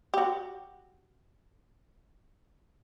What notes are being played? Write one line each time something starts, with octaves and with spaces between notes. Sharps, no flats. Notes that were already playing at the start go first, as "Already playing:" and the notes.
F#4 G4